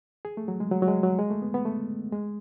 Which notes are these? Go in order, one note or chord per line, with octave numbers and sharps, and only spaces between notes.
G#4
A3
F#3
G#3
F#3
F#3
G#3
F#3
G#3
A3
B3
B3
A3
G#3